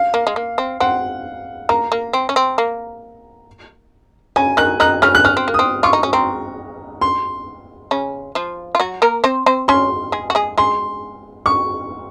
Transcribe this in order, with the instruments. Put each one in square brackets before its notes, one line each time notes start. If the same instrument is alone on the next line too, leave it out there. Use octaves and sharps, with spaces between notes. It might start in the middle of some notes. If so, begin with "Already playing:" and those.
Already playing: [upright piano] F5
[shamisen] A#3
G#3
A#3
C4
[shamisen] C4 [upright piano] F#5
[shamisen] A#3 [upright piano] A#5
[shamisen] A#3
C4
C#4
C4
A#3
[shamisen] C#3 C#4 [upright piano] G#5
[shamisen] D#3 D#4 [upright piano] F#6
[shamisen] D#3 D#4 [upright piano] F#6
[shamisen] C#3 C#4 [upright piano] F6
[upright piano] F#6
[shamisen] C#4 [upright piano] F6
[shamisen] C4
A#3
[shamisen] C4 [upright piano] D#6
[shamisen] F4 [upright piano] C#6
[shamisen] D#4
C#4
[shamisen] C4 [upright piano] A#5
[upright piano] C6
[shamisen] C#3 C#4
F3 F4
F4
F#3 F#4
A#3 A#4
C4 C5
C4 C5
[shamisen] C#4 C#5 [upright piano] C6
[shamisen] G#3 G#4
F#4
G#3 G#4
[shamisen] G#3 G#4 [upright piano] C6
[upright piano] C#6